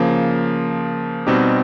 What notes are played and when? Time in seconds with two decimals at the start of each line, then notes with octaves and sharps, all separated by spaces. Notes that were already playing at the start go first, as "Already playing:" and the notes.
Already playing: C#3 F3 A#3
1.27 B2 G3 C4 D#4 G4